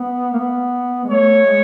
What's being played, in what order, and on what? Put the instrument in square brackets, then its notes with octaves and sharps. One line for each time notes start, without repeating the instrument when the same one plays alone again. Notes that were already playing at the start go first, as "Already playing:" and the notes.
Already playing: [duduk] B3
A#3
B3
G#3
[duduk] A3 [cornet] C#5
[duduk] G#3